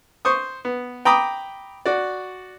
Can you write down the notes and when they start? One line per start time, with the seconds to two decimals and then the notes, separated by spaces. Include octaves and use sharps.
0.25 C5 C#6 D#6
0.65 B3
1.05 G5 A#5 B5 D6 D#6
1.86 F#4 D5